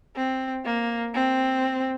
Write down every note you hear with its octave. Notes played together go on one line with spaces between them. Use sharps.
C4
A#3
C4